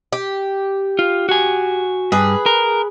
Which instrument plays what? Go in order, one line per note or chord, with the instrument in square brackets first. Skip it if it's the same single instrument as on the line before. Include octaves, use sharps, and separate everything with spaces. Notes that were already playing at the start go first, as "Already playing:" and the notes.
[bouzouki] G4
[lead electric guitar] F4
F#4 G#5
[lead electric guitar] G2 [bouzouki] G#4 B4
[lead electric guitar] A#4